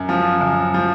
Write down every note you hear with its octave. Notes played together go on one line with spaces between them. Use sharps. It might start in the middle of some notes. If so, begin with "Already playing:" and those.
Already playing: F#2
F3
F#2
F3